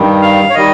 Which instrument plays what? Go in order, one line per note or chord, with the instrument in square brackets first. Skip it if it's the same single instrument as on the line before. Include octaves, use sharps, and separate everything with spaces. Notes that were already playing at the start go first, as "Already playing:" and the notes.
Already playing: [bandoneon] G2 D#3 G3
F5
C#5
D#3 G3 D#5